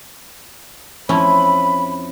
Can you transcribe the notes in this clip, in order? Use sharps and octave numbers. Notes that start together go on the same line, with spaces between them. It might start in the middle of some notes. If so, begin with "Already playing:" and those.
F2 C#4 E4 B5